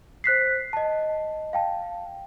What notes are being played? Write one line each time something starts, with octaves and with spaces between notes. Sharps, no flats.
C5 F#6 B6 C7
D#5 A5
F5 G5 A5